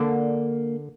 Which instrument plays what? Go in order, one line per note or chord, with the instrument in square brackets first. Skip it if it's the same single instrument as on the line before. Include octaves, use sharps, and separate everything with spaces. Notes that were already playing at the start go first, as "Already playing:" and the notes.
Already playing: [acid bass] D3 [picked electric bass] A#3